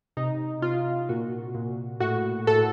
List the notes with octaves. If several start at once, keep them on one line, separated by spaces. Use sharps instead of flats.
C3 D#4
C3 F4
A#2 F#4
A#2
A2 F#4
A2 A4